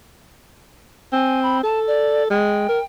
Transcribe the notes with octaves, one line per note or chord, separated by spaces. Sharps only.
C4 G#5
B5
A4 A5
D5
G#3 G5
A#4